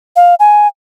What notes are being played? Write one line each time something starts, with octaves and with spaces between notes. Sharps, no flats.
F5
G#5